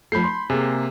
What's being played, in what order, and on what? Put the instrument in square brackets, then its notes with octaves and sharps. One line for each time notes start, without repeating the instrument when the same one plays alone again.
[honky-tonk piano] F3 A3 [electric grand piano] B5 G6 C7
[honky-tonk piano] C6
[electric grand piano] C3 A#3 [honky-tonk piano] G#4